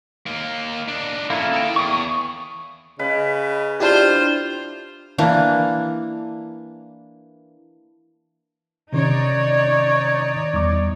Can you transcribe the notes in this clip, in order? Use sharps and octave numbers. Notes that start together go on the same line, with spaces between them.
D#2 A#3
D4 D#4
F3 A#3 C#4 E4 A4
D#4 G5
E2 C#6 D#6
C#3 B4 D#5
D4 E4 F4 G4 C5
E3 A#3 D4
C3 D#3 C#4 D#4 C#5 D5
E2 G3 D6